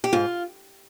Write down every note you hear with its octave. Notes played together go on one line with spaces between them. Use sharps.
G4
G#2 F4